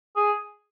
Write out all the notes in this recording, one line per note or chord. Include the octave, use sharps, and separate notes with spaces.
G#4